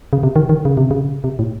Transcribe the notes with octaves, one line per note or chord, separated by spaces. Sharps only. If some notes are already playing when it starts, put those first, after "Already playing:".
C#3
C3
D#3
D#3
C#3
C3
C#3
C3
A2